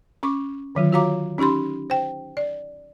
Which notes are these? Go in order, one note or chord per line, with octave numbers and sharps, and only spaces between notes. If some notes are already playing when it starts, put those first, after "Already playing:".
C#4 C#6 D6
D3 D#3 F#3 F4
F4 F#4 C#5 F5 A#5 D6
C#4 D#4 G4 B5 C6
C5 G5
D5